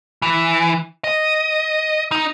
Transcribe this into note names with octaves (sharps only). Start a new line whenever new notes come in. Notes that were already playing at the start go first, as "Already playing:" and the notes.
E3
D#5
D#4